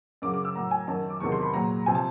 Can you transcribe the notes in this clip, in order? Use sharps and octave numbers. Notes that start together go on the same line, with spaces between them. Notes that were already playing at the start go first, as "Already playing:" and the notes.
F#2 C#3 F#3 D6
D6
E6
A2 F#3 A#5
G#5
F#2 D#3 F#3 A5
D6
E2 C3 D#3 F#3 C#6
C6
B5
A#2 F#3 A#5
C3 F3 G#5
A5